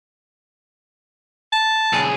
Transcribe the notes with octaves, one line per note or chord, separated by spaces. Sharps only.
A5
B1 G#4